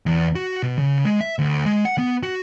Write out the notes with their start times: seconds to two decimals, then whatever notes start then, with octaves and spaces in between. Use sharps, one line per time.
0.06 E2
0.35 F#4
0.63 B2
0.78 C#3
1.05 G#3
1.21 E5
1.39 D2
1.66 G#3
1.85 F#5
1.98 B3
2.23 F#4